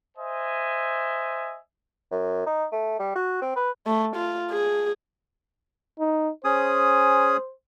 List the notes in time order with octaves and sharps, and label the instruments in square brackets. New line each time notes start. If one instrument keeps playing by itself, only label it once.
[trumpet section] C5 D#5 E5 G#5
[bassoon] F#2
D#4
A3
G3
F#4
C4
B4
[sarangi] A3
F4
G#4
[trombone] D#4
[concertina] C#4 G#4 D#6 [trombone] C5